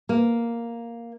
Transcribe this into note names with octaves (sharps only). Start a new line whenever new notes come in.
A#3